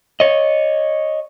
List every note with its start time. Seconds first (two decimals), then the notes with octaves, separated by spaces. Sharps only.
0.20 C#5 D#5